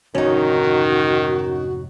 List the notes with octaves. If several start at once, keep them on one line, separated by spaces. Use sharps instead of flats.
F1 G#2 D3 D#3 C#4 D#4 F#4